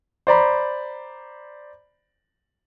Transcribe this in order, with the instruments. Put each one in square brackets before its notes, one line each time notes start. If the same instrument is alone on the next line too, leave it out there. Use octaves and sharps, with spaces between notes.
[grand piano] C5 D5 A#5 B5